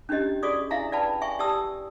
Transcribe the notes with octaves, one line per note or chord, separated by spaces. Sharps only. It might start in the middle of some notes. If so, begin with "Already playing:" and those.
C#4 D4 E4 G4 D#5
F#4 G#4 D5 C#6 D#6
E4 E5 F5 G#5 A#5
B4 D5 F5 G5 A5 B5
E5 G5 G#5 C#6
G4 D5 A5 D#6 E6